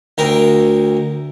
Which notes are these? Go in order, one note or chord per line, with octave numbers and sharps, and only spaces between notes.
D2 A#4 G5